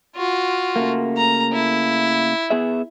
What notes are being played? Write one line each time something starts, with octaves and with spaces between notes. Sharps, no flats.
F4 F#4
C#3 A3 A#3
A#5
E4
B3 G#4 E5